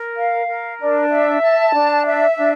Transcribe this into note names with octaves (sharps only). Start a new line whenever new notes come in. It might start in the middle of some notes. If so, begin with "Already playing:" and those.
Already playing: A#4
F5
A#4
D4
E5
A5
D4
E5
D4